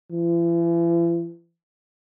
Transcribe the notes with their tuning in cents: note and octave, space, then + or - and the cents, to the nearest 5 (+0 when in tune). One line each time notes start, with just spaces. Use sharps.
E3 +45